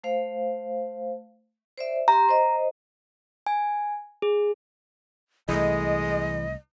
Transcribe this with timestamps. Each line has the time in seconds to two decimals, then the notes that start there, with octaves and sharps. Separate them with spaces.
0.04 A3 C5 F5
1.78 C5 D5 E5
2.08 G4 A#5 C6
2.29 C5 D#5
3.47 G#5
4.22 G#4
5.49 C2 E3 G#3 A3 D#5